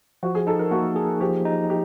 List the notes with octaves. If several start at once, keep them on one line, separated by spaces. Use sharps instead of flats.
F3 F#4
G#4
D#4 A4
A#4
A#3 F#4
G#4
F3 G4
D#4
G4